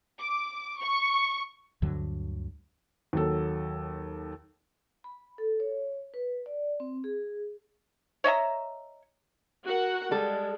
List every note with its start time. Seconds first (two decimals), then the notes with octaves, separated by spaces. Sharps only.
0.19 D6
0.79 C#6
1.82 D2 G2 D3 F#3
3.13 D#2 F#3 A4
5.04 B5
5.38 A4
5.60 C#5
6.14 B4
6.46 D5
6.80 C4
7.04 G#4
8.24 C#5 D#5 E5 A#5
9.64 F#4 A#4 F#5
10.11 G3 G#3 A4